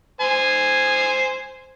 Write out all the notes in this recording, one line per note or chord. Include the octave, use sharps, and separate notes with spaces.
C5 G#5